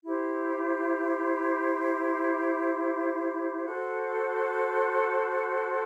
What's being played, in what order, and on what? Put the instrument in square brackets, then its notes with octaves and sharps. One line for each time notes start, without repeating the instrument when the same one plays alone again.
[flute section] E4 G4 C5
F#4 A4 C5